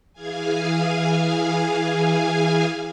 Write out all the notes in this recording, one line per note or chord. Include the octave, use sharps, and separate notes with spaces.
E3 G#4 F5 G#5